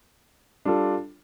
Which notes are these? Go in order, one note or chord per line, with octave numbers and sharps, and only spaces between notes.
G3 D4 F4 A4